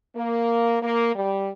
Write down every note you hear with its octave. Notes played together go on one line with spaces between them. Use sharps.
A#3
A#3
G3